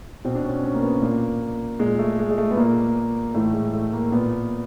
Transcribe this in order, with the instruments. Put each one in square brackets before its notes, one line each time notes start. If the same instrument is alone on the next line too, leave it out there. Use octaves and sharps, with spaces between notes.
[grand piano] B2 C4
D4
C#4
C#4
A#3
B3
A#2 A#3
A#2 G#3
A3
G#3
G#3
A3
B3
A#2 A#3
A2 E3 A3
G#3
A3
A#3
A#2 B3